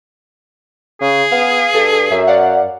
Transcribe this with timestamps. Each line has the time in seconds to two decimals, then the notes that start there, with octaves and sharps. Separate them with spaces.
1.01 C#3 G#4
1.31 B3 F5
1.74 G2 A4
2.11 F#2 E5
2.27 D5 F5 F#5